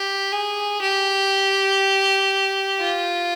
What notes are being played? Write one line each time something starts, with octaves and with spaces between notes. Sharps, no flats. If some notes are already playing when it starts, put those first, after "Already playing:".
Already playing: G4
G#4
G4
F4